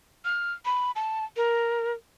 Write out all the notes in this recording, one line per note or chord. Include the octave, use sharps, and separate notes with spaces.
F6
B5
A5
A#4